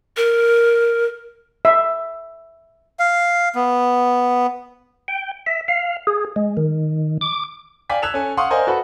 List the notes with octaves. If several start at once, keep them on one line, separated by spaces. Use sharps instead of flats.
A#4
E5
F5
B3
G5
E5
F5
G#4
G#3
D#3
D6
D5 F5 G5 G#5 B6
E6 F#6 G#6 B6 E7 F7
C#4 A4 G#5
F5 F#5 C6 C#6 D#6
A#4 C5 D5 D#5 F5 G#5
F#4 A4 B4 F#5 B5